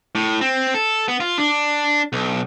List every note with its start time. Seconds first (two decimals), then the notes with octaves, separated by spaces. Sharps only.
0.15 A2
0.41 C4
0.74 A4
1.08 B3
1.20 F4
1.38 D4
2.13 B1